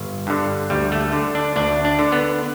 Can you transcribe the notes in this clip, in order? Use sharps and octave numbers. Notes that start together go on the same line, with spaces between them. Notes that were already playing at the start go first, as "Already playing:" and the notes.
Already playing: G1
G2 D3
D2 G3
A3
D3
D4
D2 D4
D4
D3
B3